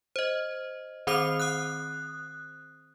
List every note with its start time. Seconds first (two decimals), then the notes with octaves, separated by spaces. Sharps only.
0.16 C5 D#5
1.07 D#3 C4 C5 D6 C7 F7
1.40 D#6 F#6